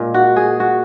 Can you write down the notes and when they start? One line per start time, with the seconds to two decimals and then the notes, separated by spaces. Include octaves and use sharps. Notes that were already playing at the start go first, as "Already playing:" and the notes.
Already playing: A#2 G#3
0.14 F#4
0.36 G#4
0.60 F#4